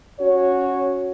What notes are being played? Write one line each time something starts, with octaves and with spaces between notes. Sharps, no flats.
C#4 F#4 C#5